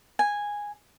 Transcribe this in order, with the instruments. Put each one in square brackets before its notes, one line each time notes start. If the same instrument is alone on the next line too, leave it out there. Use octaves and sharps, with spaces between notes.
[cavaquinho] G#5